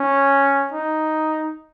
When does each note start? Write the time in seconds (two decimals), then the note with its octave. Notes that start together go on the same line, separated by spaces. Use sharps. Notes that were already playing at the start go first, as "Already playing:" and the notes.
Already playing: C#4
0.73 D#4